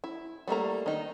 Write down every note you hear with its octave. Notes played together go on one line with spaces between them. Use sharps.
E4
G3 A3 A#3 A#5
D#3 D#4